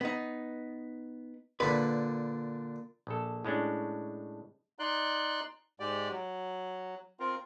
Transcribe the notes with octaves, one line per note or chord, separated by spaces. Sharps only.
B3 D#4
A#2 D3 B4
A#1 A4
A2 G#3 C#4 D4
D#4 D5 C6 F#6
G#2 G#3 G4 D5
F#3
C4 F4 A#4